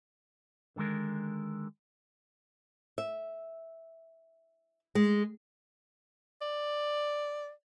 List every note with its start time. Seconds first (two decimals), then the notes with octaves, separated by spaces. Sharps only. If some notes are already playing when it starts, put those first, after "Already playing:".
0.76 D3 D#3 F3 G#3 A#4
2.98 E5
4.95 G#3
6.42 D5